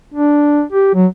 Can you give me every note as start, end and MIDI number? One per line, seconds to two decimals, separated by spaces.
0.14 0.63 62
0.72 0.91 67
0.95 1.07 54